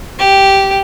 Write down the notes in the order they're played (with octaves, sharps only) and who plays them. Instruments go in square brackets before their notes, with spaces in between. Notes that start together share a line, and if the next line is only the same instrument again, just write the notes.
[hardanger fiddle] G4